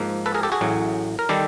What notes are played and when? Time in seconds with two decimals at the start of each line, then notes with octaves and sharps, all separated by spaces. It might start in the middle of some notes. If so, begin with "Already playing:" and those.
Already playing: G#2 F3 A#3
0.26 A4 B4
0.34 G#4 A#4
0.43 G4 A4
0.52 F#4 G#4
0.61 A1 A2 F#3
1.19 A#4
1.29 D#3 G3 G4 A4